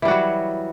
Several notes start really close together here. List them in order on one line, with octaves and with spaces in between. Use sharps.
E3 G3 F#4 F#3